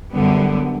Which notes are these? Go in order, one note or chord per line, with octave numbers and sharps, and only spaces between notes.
F#2 D3 G3 B3